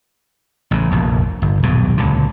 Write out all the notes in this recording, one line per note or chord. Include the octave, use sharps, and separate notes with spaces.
A1 C#3
F1 A#1 D#2
G1
D#1 B1 G2 B2
C#2 A#2 D3